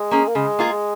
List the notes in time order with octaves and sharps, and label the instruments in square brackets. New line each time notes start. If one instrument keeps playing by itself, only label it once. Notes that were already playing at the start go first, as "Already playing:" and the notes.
Already playing: [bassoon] G#3
[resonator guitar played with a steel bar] A#3 C#4 G#4
[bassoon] A#3
[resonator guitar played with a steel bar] C#3 [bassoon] G#3
[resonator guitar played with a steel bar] A#3 F4 G#4